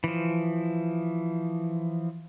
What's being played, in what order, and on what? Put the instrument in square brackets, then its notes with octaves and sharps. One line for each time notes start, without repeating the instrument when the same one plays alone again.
[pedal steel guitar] E3 F3